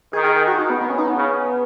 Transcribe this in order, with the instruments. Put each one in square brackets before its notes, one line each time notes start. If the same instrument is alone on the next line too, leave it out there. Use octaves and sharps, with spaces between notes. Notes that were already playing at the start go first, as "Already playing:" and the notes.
[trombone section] D#3 [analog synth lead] G#4
[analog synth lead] G#4
G#4
F#4
D#4
B3
B3
C#4
D#4
B3
[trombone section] C#3